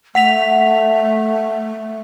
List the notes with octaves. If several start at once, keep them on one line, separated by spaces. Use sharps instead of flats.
A3 F#5 B6 F7